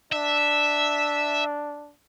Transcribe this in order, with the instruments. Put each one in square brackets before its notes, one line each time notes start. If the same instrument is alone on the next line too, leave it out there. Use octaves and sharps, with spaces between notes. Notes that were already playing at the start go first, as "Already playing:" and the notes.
[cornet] D4 [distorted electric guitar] E5